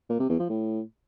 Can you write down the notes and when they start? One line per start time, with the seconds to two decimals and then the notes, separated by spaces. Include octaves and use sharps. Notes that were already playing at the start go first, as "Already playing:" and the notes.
0.10 A#2
0.19 C3
0.29 E2
0.39 F3
0.49 A2